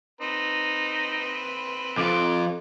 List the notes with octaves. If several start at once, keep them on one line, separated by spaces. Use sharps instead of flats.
C4 D#4 B4 B5
F2 F4 D6